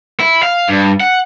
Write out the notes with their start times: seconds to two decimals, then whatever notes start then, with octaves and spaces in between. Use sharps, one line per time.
0.20 E4
0.43 F5
0.69 G2
1.00 F#5